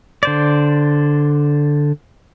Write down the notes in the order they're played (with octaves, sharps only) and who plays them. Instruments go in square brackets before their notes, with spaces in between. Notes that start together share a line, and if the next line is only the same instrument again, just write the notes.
[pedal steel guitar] D3 C5 D5